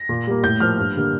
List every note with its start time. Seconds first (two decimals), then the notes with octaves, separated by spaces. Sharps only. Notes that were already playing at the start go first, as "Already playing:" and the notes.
Already playing: A#6
0.09 A#2
0.27 G3 A#3
0.43 A2 G6
0.60 F3 A#3 F6
0.78 G2
0.96 D3 G3 A#3